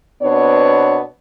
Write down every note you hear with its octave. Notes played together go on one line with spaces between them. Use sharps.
B2 B3 C4 D4 C#5